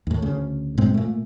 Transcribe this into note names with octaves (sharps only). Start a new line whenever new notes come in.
D#2 A2
D2 C#3
G#2 B2 G#3 C4
A#2 A3